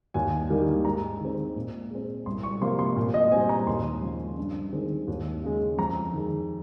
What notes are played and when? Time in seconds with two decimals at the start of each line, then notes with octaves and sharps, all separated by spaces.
0.14 D#2 G#5
0.50 D#3 G3 A#3
0.85 G#2 A#5
1.20 D#3 G#3 C4
1.56 A#2
1.91 G#3 C4
2.26 C2 C6
2.43 C#6
2.61 C3 F3 A#3 C6
2.79 C6
2.96 A#2
3.14 D#5
3.32 G3 C4 G#5
3.49 A#5
3.67 D#2 C6
4.02 C#3 F3
4.38 G2
4.72 D#3 G#3 C4
5.08 D#2
5.43 C#3 G#3
5.78 F2 A#5
6.13 D#3 G#3